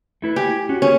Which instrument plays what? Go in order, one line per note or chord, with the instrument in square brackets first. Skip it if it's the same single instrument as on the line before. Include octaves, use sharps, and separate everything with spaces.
[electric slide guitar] A3 E4 B4
[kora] G4 [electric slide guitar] G#5
[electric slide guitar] C#4 F#4
[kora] C#4 [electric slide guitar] G4 G#4